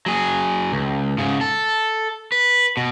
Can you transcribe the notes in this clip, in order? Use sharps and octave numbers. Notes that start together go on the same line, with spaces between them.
F#3 G#4
C#2
G#2 C#3
A4
B4
B2